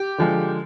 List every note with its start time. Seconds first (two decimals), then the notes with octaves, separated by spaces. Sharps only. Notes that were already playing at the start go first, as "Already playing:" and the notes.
Already playing: G4
0.18 D3 F3 G#3